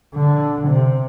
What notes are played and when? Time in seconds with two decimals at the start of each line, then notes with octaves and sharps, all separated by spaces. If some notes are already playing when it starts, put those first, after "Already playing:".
0.15 D3
0.67 C3